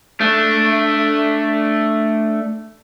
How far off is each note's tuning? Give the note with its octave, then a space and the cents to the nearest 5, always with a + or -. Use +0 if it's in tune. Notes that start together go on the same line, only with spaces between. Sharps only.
A3 +0 D4 +0